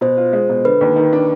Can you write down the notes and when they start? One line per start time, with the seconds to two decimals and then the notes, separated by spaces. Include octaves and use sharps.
0.01 B2 C5
0.17 F4
0.33 G#3
0.49 B2
0.65 D3 B4
0.81 D#2
0.96 D#3
1.13 D4